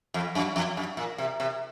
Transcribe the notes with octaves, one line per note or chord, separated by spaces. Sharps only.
F2
F#2
F2
F#2
A#2
C3
C3